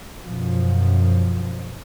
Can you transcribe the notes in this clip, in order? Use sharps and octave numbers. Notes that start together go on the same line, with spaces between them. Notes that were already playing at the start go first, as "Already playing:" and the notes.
F#2 B2 F3